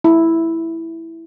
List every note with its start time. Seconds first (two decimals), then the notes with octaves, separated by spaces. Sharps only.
0.04 E4